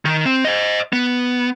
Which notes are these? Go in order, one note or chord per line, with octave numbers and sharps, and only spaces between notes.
D#3
C4
C5 D#5
B3